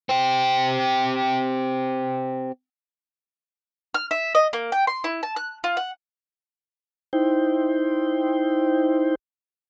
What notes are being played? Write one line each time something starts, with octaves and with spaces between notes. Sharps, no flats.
C4 G4
F6
E5
D#5
A#3
G5
C6
E4
A5
F#6
F4
F#5
D#4 E4 C5 G5